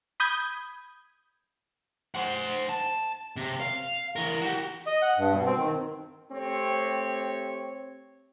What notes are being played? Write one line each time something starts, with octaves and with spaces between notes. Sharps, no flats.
B5 D#6 G6 G#6
C5 F#5
A5
C3
F5
E3 A#4
F#4 G4
D#5
F#5
G2
B2
C4
D#3
A3 C4 G4 C#5